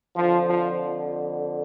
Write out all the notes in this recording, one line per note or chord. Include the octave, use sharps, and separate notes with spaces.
F2 D3 F3
F3